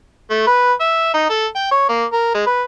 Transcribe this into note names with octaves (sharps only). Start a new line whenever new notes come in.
A3
B4
E5
D#4
A4
G5
C#5
A#3
A#4
G#3
B4